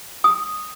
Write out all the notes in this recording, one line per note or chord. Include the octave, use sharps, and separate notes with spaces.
D#6